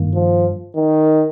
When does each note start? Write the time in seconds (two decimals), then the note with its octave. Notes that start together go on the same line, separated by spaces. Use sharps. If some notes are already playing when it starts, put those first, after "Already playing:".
Already playing: G2 D#3 A#3
0.14 F3
0.75 D#3